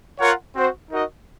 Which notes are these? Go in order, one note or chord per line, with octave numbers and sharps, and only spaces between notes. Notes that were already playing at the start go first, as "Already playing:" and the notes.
F4 A#4 C#5 F#5
C4 F#4 C5
D#4 F#4 A#4 D#5